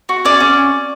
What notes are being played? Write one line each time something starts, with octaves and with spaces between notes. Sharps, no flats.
F#4
C#4 D5
C#4